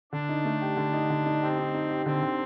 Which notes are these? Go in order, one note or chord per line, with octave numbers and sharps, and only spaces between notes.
D3 D4
D#4
A3
G4
D3
D#4
D3
D#4
C4 G4
D#4
D#4
G4
D3 C4
D3